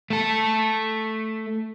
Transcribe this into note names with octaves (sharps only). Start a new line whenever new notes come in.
A3 A4